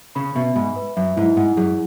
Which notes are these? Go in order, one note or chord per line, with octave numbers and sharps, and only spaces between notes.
C#3 B5
B2 E5
G#2 B5
B4
F#2 E5
G#2 E4
G#2 F#5
F#2 G#4